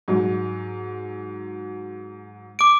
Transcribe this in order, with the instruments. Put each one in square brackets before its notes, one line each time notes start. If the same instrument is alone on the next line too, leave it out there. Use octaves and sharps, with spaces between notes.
[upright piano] G#2 F#3
[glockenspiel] D6 D7